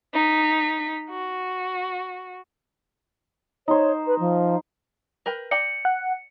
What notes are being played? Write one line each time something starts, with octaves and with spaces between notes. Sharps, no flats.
D#4 B6
F#4
D#4 C5 C#5
B4
F3
A#4 B4 G5
D5 G5 A#5 C#7
F#5